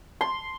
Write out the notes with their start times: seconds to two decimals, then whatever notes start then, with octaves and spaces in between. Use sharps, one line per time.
0.21 C6